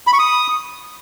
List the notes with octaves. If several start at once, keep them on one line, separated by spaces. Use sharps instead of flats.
B5
C#6
D#6